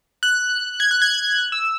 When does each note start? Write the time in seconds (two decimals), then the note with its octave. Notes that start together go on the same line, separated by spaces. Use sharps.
0.23 F#6
0.80 G#6
0.91 F#6
1.02 G#6
1.38 F#6
1.52 E6